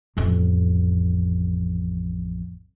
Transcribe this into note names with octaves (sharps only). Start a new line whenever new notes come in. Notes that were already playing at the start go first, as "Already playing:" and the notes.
A1 F2